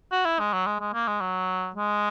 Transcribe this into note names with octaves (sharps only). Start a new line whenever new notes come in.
F#4
E4
G#3
F#3
G#3
G#3
A#3
G#3
F#3
G#3